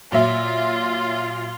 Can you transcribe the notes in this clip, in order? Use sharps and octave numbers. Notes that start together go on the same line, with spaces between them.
A#2 F#3 F4 E5